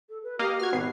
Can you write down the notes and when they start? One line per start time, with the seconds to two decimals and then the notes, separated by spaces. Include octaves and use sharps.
0.09 A4
0.23 B4
0.39 A#3 G4 D#5 F5
0.60 F#4 F6 G#6
0.73 G#1 B2 B3 C7